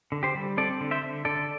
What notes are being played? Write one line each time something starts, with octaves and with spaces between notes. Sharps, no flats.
D3
G4 C5
G3
C4 A4 D5
D3
C5 E5
D3
D3 A4 D5